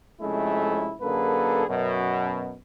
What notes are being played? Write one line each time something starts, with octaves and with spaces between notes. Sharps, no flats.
F2 C3 G#3 A3 C#4 E4
F#2 D3 A#3 G#4 A4 B4
F#2 B2